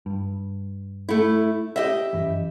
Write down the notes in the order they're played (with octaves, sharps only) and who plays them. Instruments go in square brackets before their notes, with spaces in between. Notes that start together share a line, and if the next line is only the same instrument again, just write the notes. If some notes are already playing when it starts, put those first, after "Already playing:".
[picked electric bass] G2
[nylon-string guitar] A3 E4
G4 D#5 E5
[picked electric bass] G1 F#2 E3